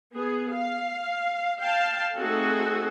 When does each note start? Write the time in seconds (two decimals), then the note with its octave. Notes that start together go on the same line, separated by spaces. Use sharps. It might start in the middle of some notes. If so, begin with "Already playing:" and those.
0.13 B3 G#4
0.52 F5
1.60 F5 G5 A5
2.15 A3 C4 D#4 F#4 G#4 A4